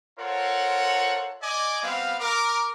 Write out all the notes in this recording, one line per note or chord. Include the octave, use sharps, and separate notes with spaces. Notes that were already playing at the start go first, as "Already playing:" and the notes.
F4 A4 A#4 C5 C#5 F#5
D5 D#5 G#5 D6
G3 B3 C4 F5
A#4 D6